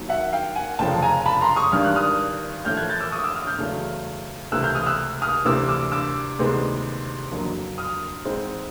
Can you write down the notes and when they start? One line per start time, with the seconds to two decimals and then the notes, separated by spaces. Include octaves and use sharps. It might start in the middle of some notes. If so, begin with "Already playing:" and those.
Already playing: D#2 D#3 F#3
0.09 E5 F#5
0.33 F5 G5
0.55 F#5 G#5
0.79 F1 F2 C#3 F3 G5 A5
1.02 G#5 A#5
1.26 A5 B5
1.41 A#5 C6
1.56 C#6 D#6
1.72 G#1 G2 D#3 F6
1.85 F#6
1.95 D#6 F6
2.65 A1 A2 F3 A3 F6 G6
2.77 F#6 G#6
2.89 G6 A6
3.00 D6 E6
3.12 C#6 D#6
3.24 D6 E6
3.35 D#6 F6
3.47 F6 G6
3.58 E2 C#3 F#3 A3
4.51 C#2 C3 E3 A3 E6 F#6
4.64 F6 G6
4.75 D#6 F6
4.86 E6 F#6
5.22 D#6 F6
5.45 D2 C3 E3 D6 E6
5.69 D6 E6
5.92 D6 E6
6.39 D2 C3 D#3 G#3 B3
7.31 F#1 F2 D3 F#3 A#3
7.78 D#6 F6
8.25 G#2 E3 G#3 C4